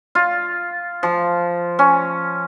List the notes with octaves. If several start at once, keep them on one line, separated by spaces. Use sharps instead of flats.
F4
F3
C#4